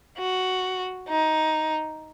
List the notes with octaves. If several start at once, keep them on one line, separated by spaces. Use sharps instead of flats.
F#4
D#4